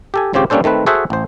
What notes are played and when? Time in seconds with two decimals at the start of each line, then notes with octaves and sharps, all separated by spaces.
0.14 G4 A4 G#5
0.33 G#1 C#3 C4 F4 G4 C#5
0.50 G3 A#3 C#4 D4 A4 C5
0.64 D#3 A3 C4 B4
0.86 F#4 G#4 A4 C5 E5 F#5
1.10 A1 C5